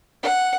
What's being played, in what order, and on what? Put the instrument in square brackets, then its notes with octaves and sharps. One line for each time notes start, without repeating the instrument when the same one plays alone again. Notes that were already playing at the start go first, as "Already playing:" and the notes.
[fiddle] F#5